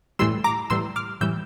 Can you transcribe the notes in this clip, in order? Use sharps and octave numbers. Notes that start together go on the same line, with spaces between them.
A2 E3 G3 C6 E6
A#5 D6
A2 E3 G3 C6 E6
D6 F6
A2 E3 G3 E6 G6